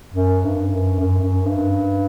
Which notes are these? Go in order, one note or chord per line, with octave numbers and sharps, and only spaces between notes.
F#2
G2
F#2
F#2
F#2
G2